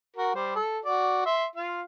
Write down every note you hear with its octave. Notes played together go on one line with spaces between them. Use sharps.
F#4 A#4
G3 C5
A4
F#4 D5
E5 C6
F4 F5